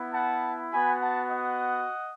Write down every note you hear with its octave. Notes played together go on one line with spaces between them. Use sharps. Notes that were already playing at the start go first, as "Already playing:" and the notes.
Already playing: B3 E4
F#5 A5
B3 F#4 G#5 B5
F#5 A5
D#5 F#5